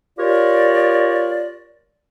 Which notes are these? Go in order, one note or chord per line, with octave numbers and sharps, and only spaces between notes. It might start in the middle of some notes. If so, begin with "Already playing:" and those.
F4 G4 A#4 C#5 D5